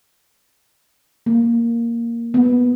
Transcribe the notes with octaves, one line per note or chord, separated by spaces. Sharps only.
A#3
B3